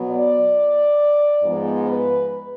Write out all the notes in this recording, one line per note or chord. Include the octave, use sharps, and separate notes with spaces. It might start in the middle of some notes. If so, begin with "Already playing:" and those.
Already playing: B2 F#3 B3
D5
G#2 F3 G#3 B3
B4